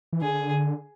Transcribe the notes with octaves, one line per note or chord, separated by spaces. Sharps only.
E3
D3 G#4